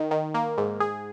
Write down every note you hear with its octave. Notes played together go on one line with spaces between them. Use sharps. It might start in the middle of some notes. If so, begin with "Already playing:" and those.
Already playing: D#3
D#3
A#3
G#2
G#4